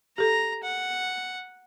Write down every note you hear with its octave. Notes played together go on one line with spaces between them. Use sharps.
G4 A4 A#5
F#5